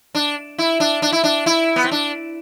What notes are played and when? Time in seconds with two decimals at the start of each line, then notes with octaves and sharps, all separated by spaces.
0.15 D4
0.58 E4
0.80 D4
1.02 D4
1.12 E4
1.24 D4
1.46 E4
1.76 B3
1.84 C4
1.91 D4